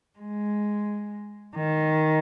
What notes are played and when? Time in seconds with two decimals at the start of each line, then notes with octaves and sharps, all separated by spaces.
0.18 G#3
1.55 D#3